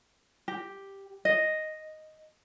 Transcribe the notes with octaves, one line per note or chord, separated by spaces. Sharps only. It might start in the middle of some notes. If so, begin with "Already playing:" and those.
G4
D#5